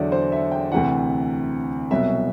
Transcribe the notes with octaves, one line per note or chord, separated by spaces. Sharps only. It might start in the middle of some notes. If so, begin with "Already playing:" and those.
Already playing: E2 D3 F#3 D5 E5 F#5
C5
E5
G5
D2 C3 E3 F#5
C2 B2 F#3 E5